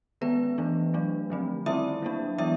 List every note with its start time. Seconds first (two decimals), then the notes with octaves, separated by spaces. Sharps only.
0.21 D#3 G#3 B3 C#4 B4
0.58 E3 A3 D4
0.94 F#3 A3 D4
1.30 D3 F3 A3 C4
1.66 D#3 G3 C4 E4 E5
2.02 F#3 A#3 D4
2.38 E3 G#3 B3 D4 E4 E5